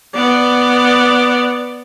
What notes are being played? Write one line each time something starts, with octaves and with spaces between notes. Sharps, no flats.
B3 D5